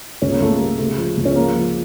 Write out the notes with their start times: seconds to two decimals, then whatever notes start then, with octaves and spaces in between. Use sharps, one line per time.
0.22 C#2 C#4
0.32 A#3
0.40 C#2 A3
0.53 A#3
0.59 G3
0.79 C#3 A3
0.98 F3
1.17 C#2
1.25 C#4
1.36 F3 A#3
1.55 F3